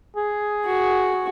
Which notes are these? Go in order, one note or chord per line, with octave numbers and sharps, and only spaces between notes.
G#4
F#4